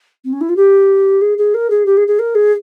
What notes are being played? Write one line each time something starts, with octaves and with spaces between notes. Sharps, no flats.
C4
C#4
E4
F4
G4
G#4
G#4
A#4
G#4
G4
G#4
G#4
A#4
G#4